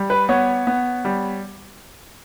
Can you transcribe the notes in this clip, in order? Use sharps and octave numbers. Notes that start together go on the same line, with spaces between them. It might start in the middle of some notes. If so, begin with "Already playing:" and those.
Already playing: G3
B4
B3 C#5
B3
G3